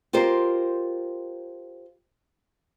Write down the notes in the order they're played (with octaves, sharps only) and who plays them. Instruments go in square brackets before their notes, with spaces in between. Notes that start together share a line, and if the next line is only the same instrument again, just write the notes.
[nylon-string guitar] F4 G4 A#4 C5